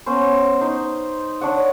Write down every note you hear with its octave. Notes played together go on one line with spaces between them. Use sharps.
B3 C#4 C5
D#4 C5
D4 C#5 D5 F#5